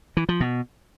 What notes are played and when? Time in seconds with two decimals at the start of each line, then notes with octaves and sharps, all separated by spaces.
0.17 E3
0.29 F3
0.41 B2